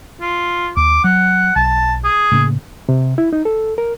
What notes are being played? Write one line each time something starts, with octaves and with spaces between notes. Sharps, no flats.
F4
D#2 D6
F#3 F#5
B1 A5
G#4
A2 C#3 A#3
C3
E4
D#4
A4
A#4